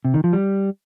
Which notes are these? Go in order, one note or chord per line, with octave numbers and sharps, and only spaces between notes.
C3
D#3
F3
G3